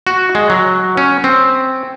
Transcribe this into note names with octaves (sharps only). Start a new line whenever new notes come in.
F#4
G#3
F#3
C#4
C4